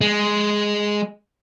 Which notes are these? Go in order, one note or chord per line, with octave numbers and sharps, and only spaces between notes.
G#3